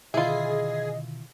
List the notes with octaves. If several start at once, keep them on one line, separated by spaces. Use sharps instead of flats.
B2 D3 D#3 E4 F4 G#4 D#5